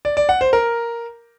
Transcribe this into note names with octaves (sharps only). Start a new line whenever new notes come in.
D5
D5
F#5
C5
A#4